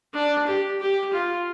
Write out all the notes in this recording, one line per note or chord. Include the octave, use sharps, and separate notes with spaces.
D4
G4
G4
F4